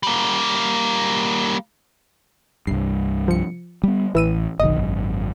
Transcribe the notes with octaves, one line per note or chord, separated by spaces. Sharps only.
G3 A#3
C2 G2 C7
F3 C#7
G3 B3
A1 E3 E6 D#7
F#1 B1 D#3 D#5
G#1 F#2